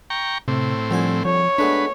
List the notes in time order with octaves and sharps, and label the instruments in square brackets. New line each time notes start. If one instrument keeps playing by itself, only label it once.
[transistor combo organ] G5 A#5 C#6
[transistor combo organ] A2 C4 [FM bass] C3
[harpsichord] C2 D3 G#5 [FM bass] F3
[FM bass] F3 [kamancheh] C#5
[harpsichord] B2 G#3 A3 [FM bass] D4 [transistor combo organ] B4